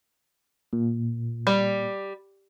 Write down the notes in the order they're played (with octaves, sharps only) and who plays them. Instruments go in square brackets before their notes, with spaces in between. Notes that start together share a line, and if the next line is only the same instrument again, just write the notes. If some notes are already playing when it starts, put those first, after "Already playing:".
[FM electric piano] A#2
[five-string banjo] G3